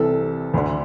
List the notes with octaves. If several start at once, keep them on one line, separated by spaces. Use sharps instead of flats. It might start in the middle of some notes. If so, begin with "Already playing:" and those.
Already playing: C2 C3 E3 A4
D2 D3